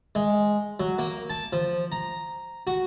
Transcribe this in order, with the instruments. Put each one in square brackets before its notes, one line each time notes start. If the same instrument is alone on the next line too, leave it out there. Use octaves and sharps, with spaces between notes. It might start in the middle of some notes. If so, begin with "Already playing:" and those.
[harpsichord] G#3
F#3
A#3
A5
F3
A#5
F#4